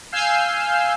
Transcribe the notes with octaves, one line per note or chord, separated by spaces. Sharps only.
F5 G#5 E6 F6 G6 C7